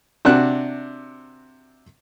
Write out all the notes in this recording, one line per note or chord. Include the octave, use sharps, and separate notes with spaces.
C3 D4 F#4 F#6